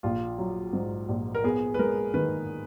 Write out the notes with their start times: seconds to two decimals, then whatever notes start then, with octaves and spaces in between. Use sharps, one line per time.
0.03 A#1 F4
0.38 F#3
0.73 G#2
1.09 A#1
1.35 A#4
1.44 B3 G#4
1.74 B4
1.79 G#3 A#4
2.14 D#3 B4